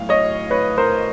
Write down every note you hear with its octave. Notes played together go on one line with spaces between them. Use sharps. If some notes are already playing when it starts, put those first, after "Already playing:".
Already playing: B1 A2 F5
C#5 D#5
B4 C#5
A#4 C5